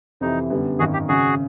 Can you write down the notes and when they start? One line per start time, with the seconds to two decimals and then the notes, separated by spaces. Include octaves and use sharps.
0.21 F2 C3 E3 D#4
0.50 F#2 D3 G3 B3
0.79 G#1 F#2 D#3 F#4 G#4
0.93 G4
1.08 G#1 F#2 C#3 F#4 G#4